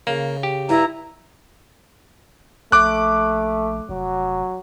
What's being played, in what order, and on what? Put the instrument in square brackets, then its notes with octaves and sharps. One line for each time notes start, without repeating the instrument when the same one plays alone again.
[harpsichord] C#3 [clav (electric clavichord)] A#3
[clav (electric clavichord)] G4
[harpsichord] G2 [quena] E4 [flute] A#5
[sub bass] A#1 [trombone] A3 [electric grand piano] D6 F#6
[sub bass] F1 [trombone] F#3